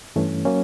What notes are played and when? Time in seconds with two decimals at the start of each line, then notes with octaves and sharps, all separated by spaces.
0.16 G2 E3 A3 C#4
0.45 F#3 A#3 C#4